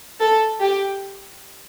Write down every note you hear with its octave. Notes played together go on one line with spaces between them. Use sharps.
A4
G4